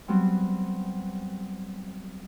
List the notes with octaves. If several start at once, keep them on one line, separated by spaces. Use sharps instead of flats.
F#3 G3 B3 C4